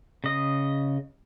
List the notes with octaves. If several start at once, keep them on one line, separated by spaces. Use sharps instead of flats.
C#3 D#5